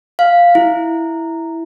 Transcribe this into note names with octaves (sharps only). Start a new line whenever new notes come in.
F5
E4